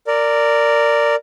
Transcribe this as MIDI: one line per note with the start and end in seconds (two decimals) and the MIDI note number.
0.07 1.15 70
0.07 1.15 74